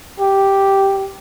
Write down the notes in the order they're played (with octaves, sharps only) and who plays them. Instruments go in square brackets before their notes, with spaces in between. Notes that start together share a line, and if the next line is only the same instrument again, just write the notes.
[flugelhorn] G4